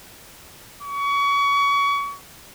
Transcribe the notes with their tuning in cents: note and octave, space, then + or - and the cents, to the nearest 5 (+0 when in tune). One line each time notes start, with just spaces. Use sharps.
C#6 +30